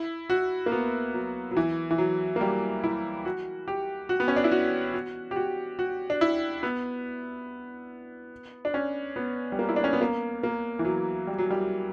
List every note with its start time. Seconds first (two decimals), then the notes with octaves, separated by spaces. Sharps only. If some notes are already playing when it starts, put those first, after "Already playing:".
Already playing: E4
0.30 F#4
0.66 A#3
0.72 B3
1.14 F#3
1.51 F#3
1.57 E3
1.91 E3
1.98 F#3
2.36 A#3
2.41 G3
2.84 E4
3.25 F#4
3.68 G4
4.09 F#4
4.20 B3
4.28 C#4
4.36 D4
4.44 E4
4.51 F#4
4.94 F#4
5.31 G4
5.36 F#4
5.79 F#4
6.10 D4
6.21 E4
6.63 B3
8.65 D4
8.74 C#4
9.16 B3
9.52 G3
9.59 A#3
9.69 E4
9.76 D4
9.84 C#4
9.93 B3
10.01 A#3
10.43 A#3
10.79 E3
10.85 F#3
11.27 G3
11.38 F#3
11.51 G3